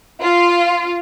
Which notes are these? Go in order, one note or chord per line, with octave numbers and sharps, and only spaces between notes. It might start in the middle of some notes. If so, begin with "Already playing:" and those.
F4